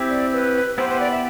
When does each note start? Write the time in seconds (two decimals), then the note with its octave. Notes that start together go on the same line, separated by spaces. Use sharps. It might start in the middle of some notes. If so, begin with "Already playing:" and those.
Already playing: C4 E4 G4
0.10 D5
0.33 B4
0.78 B3 E4 G4 B4 C5
0.89 C5
1.00 D5
1.11 E5